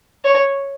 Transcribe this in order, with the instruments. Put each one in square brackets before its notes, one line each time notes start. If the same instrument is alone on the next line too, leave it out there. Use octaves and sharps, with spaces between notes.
[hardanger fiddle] C#5